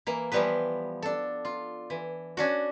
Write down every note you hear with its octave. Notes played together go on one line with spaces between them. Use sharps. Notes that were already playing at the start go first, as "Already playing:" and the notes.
E3 A#3
E3 F3 G3 B3 B4
D4 A4
F4
E3
C#4 D4 F#4